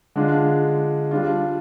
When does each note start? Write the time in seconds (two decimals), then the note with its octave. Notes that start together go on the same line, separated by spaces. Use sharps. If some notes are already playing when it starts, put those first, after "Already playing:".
0.15 D3 G#3 D4 F4
1.11 G3 D4 F4